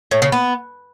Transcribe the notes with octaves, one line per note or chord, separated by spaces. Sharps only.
A2
C#3
B3